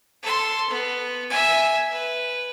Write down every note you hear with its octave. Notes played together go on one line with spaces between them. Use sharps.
A4 C6
B3
E5 G#5
B4